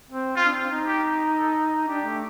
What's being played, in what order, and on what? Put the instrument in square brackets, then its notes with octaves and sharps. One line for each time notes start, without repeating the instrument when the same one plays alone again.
[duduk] C4
[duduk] C4 [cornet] F4
[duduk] D4
C4
D#4
[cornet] G4
A4
[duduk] D4 [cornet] G4
[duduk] A3